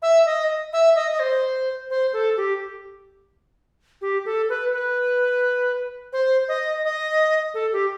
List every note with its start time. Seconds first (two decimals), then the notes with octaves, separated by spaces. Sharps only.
0.02 E5
0.26 D#5
0.73 E5
0.95 D#5
1.11 D#5
1.20 C5
1.90 C5
2.13 A4
2.37 G4
4.02 G4
4.25 A4
4.49 B4
4.73 B4
6.13 C5
6.48 D#5
6.84 D#5
7.54 A4
7.73 G4